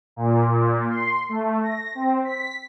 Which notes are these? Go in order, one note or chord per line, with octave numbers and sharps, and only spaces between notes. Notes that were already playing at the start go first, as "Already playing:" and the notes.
A#2
A#2
C6
A3
A#6
C4
B6